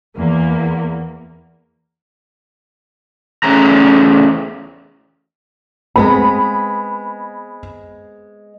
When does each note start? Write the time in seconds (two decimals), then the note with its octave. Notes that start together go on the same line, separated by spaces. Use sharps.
0.16 E2 A#3
3.43 E2 A3 C#4 G#4 A#5
5.96 G#3 B3 C4 B5